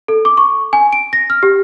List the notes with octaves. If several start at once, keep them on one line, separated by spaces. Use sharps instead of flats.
A4
D6
C#6
G#5
D7
A#6
F6
G4